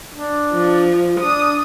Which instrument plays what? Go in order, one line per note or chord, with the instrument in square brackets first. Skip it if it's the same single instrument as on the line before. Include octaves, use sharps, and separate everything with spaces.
[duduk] D4
[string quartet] F3
[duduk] D4 [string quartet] D#6